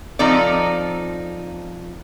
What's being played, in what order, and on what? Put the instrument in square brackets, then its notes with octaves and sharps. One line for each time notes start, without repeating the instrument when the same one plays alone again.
[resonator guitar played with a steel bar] F3 C4 D#4 A4 D5